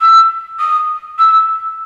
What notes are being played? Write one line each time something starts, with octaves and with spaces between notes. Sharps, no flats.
E6
D#6
E6